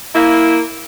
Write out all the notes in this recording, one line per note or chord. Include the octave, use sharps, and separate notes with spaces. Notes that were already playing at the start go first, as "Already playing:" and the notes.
A#3 E4